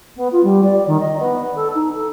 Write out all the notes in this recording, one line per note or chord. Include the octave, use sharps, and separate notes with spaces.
B3
F4
G3
D5
D#3
D#5
B3
A4
D#4
A4